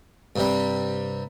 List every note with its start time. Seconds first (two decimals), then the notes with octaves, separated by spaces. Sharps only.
0.36 G2 C3 G3